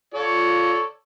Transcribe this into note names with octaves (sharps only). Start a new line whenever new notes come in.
F4 A4 C#5 D5